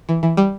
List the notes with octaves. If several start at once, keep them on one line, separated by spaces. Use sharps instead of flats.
E3
E3
G3